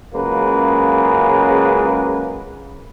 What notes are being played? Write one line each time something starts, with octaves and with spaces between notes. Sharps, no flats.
C#2 C#3 F#3 G#3 A#3 B4